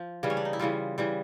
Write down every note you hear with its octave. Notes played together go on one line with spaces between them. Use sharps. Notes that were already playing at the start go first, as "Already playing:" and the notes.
Already playing: F3
C#3 E3 G3
C#4
D4
D#4
E4
C#3 E3 G3 F4
C#3 E3 G3